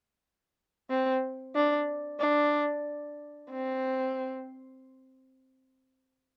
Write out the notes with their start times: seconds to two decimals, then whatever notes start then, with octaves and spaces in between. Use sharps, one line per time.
0.90 C4
1.56 D4
2.20 D4
3.51 C4